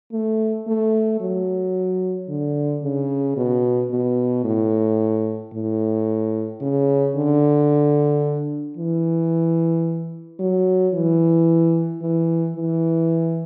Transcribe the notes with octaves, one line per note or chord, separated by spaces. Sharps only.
A3
A3
F#3
D3
C#3
B2
B2
A2
A2
C#3
D3
E3
F#3
E3
E3
E3